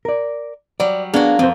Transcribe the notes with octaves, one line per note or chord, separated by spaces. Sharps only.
A#4 D5
F#3 G3 D5
A#3 B3 D4 F#4 G#4
F2 C4 C5